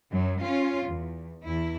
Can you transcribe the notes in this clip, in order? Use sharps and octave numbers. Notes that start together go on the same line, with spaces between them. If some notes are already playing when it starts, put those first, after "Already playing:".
F#2 F#3
C#4 F4
E2
E2 E4